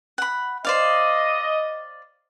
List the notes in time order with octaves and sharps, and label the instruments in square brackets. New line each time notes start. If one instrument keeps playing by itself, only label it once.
[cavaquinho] F#5 B5
[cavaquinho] C5 D5 F5 [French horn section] D#5